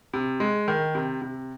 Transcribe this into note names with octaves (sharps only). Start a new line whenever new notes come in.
C3
G#3
D#3
C3
C3